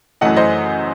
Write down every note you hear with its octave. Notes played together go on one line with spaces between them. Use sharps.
F#2 E3 A3 D#5 F#5
C5 D#5